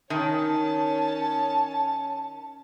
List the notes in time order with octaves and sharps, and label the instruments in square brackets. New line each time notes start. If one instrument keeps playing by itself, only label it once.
[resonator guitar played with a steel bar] D#3 [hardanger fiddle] C#4 C#5 [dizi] A5